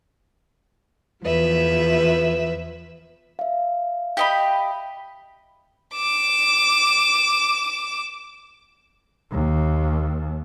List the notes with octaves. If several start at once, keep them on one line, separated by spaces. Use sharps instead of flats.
E2 F3 B4 E5
E5 F5
G4 D#5 B5
D6 E7
D#2